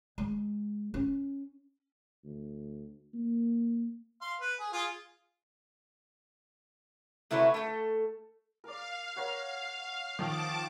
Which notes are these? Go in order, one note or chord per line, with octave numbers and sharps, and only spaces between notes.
G#3
C#4
D2
A#3
F5 C6
B4
G#4
F4 G#4
C3 A3 E4 F#4 B4 C#5
A3 A4
A#4 D5 F5
A#4 C#5 F#5
D#3 F3 A5 D6 D#6